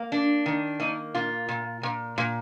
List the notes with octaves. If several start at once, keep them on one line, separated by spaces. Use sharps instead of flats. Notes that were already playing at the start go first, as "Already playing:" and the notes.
Already playing: A#3
D4
D#3
A#3 D#4
A#2 F4
A#2
A#2
A#2